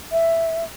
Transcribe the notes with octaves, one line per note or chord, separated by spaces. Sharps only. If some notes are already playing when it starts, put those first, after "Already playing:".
E5